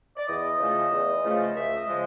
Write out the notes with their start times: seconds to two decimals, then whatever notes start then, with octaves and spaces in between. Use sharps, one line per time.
0.17 D5
0.28 E2 D#5
0.59 C#3 F3 A3
0.91 E2
1.24 C#3 F3 A3
1.55 C#2 E5
1.77 D#5
1.87 C#3 F3 G#3